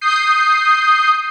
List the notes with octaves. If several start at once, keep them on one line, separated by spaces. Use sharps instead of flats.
D#6 G6 C7